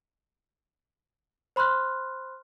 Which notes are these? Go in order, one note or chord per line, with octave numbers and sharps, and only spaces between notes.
C5 B5 C6 F6 F#6